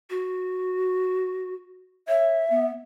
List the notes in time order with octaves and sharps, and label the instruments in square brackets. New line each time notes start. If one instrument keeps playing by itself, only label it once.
[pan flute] F#4
[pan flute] C#5 [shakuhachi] E5
[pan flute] B3